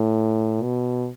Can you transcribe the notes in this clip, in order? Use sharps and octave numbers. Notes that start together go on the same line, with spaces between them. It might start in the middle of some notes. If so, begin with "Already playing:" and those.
Already playing: A2
B2